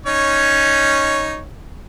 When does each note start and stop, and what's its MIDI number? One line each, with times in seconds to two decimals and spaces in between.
0.06 1.41 61
0.06 1.41 63
0.06 1.41 73